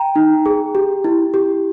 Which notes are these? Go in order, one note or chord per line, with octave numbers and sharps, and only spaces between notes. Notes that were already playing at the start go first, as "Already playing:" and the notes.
Already playing: G5 A#5
D#4
G#4
G4
E4
G4